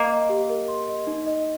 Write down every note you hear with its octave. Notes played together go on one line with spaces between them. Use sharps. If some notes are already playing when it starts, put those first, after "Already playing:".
Already playing: A#3 D#5
D#5
G4
A#4
C6
D#5
D#4
D#5